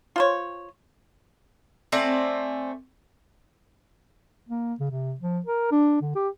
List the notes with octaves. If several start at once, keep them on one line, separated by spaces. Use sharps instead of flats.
F4 C5 C#5
A3 C4 D5 G#5
A#3
C#3
C3
F3
A#4
D4
D3
G4